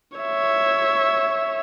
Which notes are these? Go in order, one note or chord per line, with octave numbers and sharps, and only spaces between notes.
C#5 E5